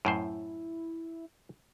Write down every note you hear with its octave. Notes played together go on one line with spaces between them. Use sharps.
F#2 A2 E4 C5